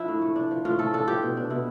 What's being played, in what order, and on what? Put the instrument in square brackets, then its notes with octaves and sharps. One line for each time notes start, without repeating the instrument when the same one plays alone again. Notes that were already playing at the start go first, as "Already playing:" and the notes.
Already playing: [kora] F3 D4 E4
A2
A3
D4
F3
A2 F4
A3 A4
D4 A4
F3 G4
B2
D4
B2 E4